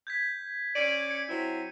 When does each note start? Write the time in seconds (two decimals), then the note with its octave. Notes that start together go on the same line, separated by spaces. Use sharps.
0.07 G6 G#6 B6
0.75 C#4 D5 C#7 D#7
1.10 C#7
1.29 F#3 C4 E4